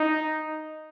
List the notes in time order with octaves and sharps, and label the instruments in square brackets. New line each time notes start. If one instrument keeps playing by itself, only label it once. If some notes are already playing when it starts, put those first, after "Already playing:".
Already playing: [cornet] D#4